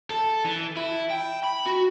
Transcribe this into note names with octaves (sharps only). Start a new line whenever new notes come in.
A4
E3
E4
G5
B5
F#4